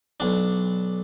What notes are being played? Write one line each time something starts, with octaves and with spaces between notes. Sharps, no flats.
B1 D4